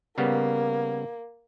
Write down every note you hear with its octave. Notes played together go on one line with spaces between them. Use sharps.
C#3 G3 A#3 B3